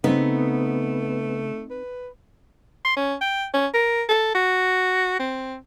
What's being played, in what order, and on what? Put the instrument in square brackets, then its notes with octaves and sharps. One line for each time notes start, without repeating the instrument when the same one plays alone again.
[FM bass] C#3 [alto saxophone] A3 [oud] B3 [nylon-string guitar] C4 D#4
[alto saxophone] B4
[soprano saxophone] C6
C#4
G5
C#4
A#4
A4
F#4
C4